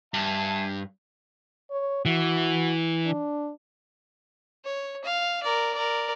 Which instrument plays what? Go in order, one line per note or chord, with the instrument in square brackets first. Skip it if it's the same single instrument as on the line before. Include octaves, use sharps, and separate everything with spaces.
[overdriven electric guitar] G2 [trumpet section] E5 G#5 A5
[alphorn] C#5
[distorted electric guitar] E3 [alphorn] F#4
[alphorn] D4
[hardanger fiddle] C#5
F5
A#4 D5
A#4 D5